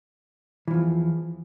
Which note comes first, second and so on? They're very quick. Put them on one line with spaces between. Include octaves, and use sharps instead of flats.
E3 F3 E2